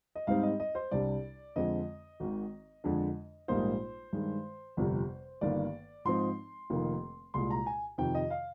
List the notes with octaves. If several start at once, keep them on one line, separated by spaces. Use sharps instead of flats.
D#5
G#2 G3 C4 D#4 F5
D#5
D#5
C5
C2 C3 G3 D4 D5
F2 D3 G#3 C4 D#5
G#1 G#2 D#3
F2 D3 G#3 D4
A#1 G#2 G3 A#3 D#4 C5
G2 D#3 G#3
G1 F2 C3 G3
G1 G2 D#3 A#3 D5
G#2 F3 C4 D#4 C6
F1 F2 D#3 A#3
C2 A#2 G#3 C6
A#5
G#5
F2 C3 D#3 G5
D#5
F5